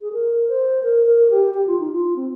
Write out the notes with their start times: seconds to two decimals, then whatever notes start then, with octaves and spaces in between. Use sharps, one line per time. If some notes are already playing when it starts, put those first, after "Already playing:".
0.01 G#4
0.13 A#4
0.48 C5
0.83 A#4
1.07 A#4
1.31 G4
1.54 G4
1.67 F4
1.80 D#4
1.92 F4
2.16 C4